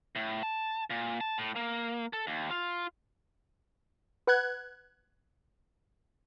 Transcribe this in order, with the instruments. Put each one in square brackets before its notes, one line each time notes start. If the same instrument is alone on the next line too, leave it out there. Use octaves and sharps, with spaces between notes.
[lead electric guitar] A2
A5
A#2
A5
A2
A#3
A4
D#2
F4
[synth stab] B4 F#5 F#6 G#6